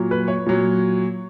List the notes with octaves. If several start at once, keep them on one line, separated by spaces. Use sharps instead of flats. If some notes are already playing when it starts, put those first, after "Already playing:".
Already playing: A#2 F#3
B4
C#5
A#2 F#3